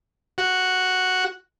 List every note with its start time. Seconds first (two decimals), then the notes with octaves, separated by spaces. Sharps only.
0.38 F#4